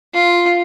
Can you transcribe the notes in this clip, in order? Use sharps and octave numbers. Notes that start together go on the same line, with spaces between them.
F4